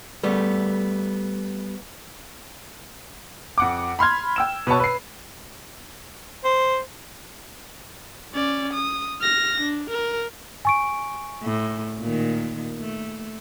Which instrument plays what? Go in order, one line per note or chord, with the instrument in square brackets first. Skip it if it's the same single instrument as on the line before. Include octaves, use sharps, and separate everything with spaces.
[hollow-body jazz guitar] G3 A3 B3
[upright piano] F2 F#5 D6
B5 C6 F6 G#6
G5 E6 E7
B2 B4 C#5 A5
B4 C7
[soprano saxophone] C5
[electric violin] C#4 D5
D#6
F6 A#6
D4
A#4
[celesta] G#5 C#6 D7
[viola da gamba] A2
A#2 D#3
A3